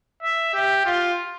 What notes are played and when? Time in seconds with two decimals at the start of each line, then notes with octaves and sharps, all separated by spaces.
0.23 E5
0.54 G4
0.86 F4